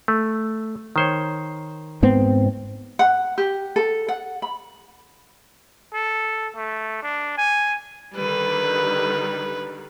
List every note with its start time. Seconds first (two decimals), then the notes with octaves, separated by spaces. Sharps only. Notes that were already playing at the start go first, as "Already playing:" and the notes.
0.08 A3
0.96 D#3 C5 C#5
2.03 G#2 B3 C4
2.99 F#5
3.38 G4
3.76 A4
4.08 F#5
4.42 B5
5.93 A4
6.56 A3
7.02 D4
7.38 G#5
8.17 D3 D#3 G3 B4